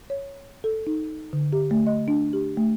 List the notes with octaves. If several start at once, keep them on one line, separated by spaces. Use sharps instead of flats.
C#5
A4
D#4
D3
G4
A3
D#5
D4
G4
A3